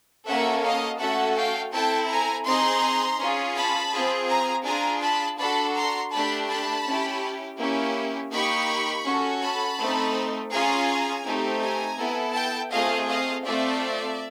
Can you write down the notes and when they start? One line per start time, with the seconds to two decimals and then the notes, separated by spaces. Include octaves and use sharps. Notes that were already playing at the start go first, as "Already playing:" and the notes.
0.27 A#3 C#4 F#4 A4 E5 F#5
0.63 D#5 F5
0.99 A3 C#4 F#4 A4 E5 F#5
1.36 F5 G5
1.73 C4 E4 A4 G5 A5
2.09 G#5 A#5
2.46 C4 D#4 G#4 A#5 C6
3.19 C#4 F4 G#4
3.56 A5 B5
3.93 C4 F4 G#4
4.29 G#5 A#5
4.65 D4 F4 G#4 G#5 A#5
5.02 A5 B5
5.39 D4 F#4 A4 A5 B5
5.75 A#5 C6
6.12 A3 D4 G4 A5 B5
6.49 A5 B5
6.86 C#4 E4 G4
7.59 A#3 C#4 E4 G4
8.31 A#3 D#4 G4 B5 C#6
9.05 C#4 F#4 A4
9.41 A5 B5
9.78 A3 C4 D#4
10.52 C#4 F4 G#4 G#5 A#5
11.25 A3 C4 D#4 G4
11.61 G#5 A#5
11.98 B3 E4 A4
12.34 G5 A5
12.71 A3 C4 F4 G#4 D#5 F5
13.08 D#5 F5
13.45 A3 C4 F4 A4 D5 E5